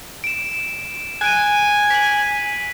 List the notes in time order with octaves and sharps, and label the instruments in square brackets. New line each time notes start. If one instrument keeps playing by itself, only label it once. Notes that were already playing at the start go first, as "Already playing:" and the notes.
[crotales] D7 E7
[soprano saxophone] G#5 [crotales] F#6 D7 D#7
[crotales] B6 F#7